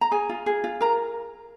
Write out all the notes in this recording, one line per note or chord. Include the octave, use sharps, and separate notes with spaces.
A#5
G#4 G#5
F4
G#4
F4
A#4 A#5